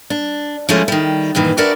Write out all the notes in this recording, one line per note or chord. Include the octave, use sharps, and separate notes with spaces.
D4
F3 F#3 G#3 A3 C#4 E4
D#3 G3
G2 A#2 D#3 E3
D4 F#4 A#4 B4 D5 E5